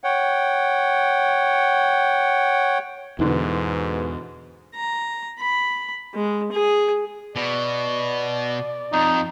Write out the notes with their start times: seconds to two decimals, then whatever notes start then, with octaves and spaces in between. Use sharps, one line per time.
0.04 C#5 F#5 G5
3.19 E2 G#2 B2 D3 E3
4.75 A#5
5.39 B5
6.14 G#3
6.52 G#4
7.36 B2 D5
8.93 F2 D#4